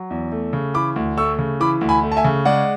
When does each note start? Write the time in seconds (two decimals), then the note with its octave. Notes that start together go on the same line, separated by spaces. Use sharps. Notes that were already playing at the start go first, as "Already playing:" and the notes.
Already playing: F#3
0.10 E2
0.32 A3
0.53 C#3
0.74 E3 B5 D6
0.96 D2
1.18 A3 C#6 E6
1.38 C#3
1.60 E3 B5 D6
1.81 D2
1.89 G#5 B5
2.03 A3
2.12 A5
2.17 E5 G#5
2.24 C#3
2.45 G#3 D5 F#5